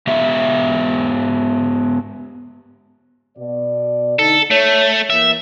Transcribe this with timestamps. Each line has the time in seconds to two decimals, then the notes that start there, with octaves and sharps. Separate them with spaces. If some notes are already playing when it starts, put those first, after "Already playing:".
0.07 G#3 B3 G4 E5 F5
3.38 B2 D5
4.19 D3 D#4 A4
4.51 A3 C#5
5.10 E3 A#3 E5